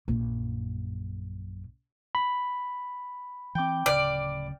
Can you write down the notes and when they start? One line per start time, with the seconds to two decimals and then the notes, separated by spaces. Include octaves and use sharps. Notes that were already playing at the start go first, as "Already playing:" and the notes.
0.08 A#1 F#2
2.15 B5
3.55 E3 C4 G5 D6
3.86 D1 C#3 D5 F6 D7